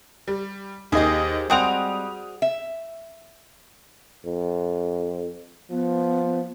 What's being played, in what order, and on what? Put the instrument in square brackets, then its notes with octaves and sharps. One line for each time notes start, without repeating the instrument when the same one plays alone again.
[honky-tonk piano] G3
[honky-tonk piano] D#2 D#5 [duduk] G4 [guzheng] G#4 C5
[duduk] G3 [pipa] G#3 C4 F#5 [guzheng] F#4 [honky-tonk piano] D#6 D7 F7
[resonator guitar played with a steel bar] E5
[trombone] F2
[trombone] F3 [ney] B3